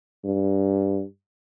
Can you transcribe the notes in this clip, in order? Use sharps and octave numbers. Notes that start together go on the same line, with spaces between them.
G2